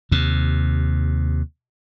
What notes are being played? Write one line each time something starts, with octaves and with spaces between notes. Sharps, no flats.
D#2 C3